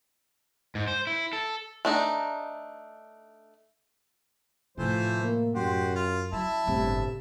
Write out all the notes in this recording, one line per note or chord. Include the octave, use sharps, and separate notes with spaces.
G#2
C5
E4
A4
A3 D4 D#4
A2 C3 E3 F3 A3 C5
A#3
F#2 F#4 G4 C6
F4
F#3 E4 E5 A5
G1 A2 C3